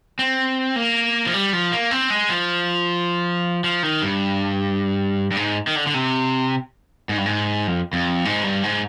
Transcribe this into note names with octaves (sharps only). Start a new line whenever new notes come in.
C4
A#3
F3
G3
F3
A#3
C4
G#3
F3
F3
D#3
G2
G2
G#2
D#3
D3
D3
C3
G#2
G2
G#2
F2
F2
G#2
G2
G#2